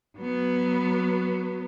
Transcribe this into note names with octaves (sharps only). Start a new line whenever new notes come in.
F#3 B3